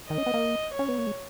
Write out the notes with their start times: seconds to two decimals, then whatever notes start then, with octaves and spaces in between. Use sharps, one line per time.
0.10 D#3 D#5
0.18 C#4
0.26 B3
0.34 A#3
0.74 C#4 C#5
0.89 B3
0.98 A#3
1.07 G#3